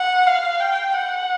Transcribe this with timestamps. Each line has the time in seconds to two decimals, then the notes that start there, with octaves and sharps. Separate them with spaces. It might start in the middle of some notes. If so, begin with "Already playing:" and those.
Already playing: F#5
0.27 F5
0.60 G5
0.93 F#5